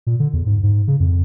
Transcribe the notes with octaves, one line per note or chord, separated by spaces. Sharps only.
A#2
D3
E2
G#2
G#2
C#3
F2